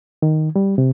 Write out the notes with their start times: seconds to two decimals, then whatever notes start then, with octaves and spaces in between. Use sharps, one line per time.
0.22 D#3
0.56 G3
0.78 C3